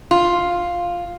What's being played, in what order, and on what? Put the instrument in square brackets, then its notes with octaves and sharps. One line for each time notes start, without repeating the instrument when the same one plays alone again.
[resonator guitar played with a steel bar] F4